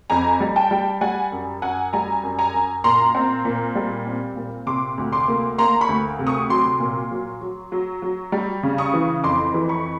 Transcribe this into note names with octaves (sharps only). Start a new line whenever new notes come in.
F2 G#5 A#5
G3
G5 A5
G3
G3 F#5 G#5
F#2
F#2 F#5 G#5
G3 G#5 A#5
F#2
G#5 A#5
F#2
A#2 A#5 C6
C4
A#2
G3
C4
A#2
C3 C6 D6
D2
C6 D6
A#3
A#3 A#5 C6
B5 C#6
D2
C3
C#6 D#6
F#3 C6 D6
A#2
F#3
F#3
F#3
F#3
G3
C#3
C#6 D#6
E3
F2 C6 D6
E3
B5 C#6